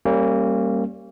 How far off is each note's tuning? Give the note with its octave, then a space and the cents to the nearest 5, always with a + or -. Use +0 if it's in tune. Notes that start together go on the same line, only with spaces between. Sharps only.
G3 +0 A#3 -25 C#4 -35